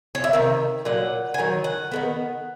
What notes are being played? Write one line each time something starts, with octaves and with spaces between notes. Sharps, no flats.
C#5
E5
C3 D#3
A#2 F#3 F#5
G#5
D#3 F#3
F#5
D#3 G#3 B3